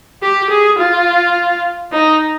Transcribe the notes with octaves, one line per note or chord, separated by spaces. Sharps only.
G4
G#4
F4
D#4